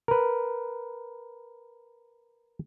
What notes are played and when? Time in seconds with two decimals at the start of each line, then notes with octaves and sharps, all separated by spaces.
0.08 A#4 B4